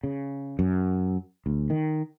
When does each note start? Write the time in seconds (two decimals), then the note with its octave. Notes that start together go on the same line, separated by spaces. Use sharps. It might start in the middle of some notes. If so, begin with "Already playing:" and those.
0.03 C#3
0.59 F#2
1.46 D2
1.70 D#3